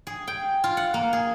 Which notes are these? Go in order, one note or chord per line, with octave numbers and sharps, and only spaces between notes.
G#4
G5
F4
F#5
A#3
G#4